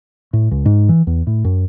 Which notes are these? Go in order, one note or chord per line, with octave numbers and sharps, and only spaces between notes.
A2
C#2
G#2
E3
E2
A2
F#2